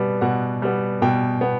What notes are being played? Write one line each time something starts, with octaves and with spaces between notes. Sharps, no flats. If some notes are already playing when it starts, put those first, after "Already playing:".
Already playing: B2 G3 B3
B2 F#5
G3 B3
B2 G5
B3